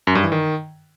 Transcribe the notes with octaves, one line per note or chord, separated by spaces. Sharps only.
F#2
G2
E3
D#3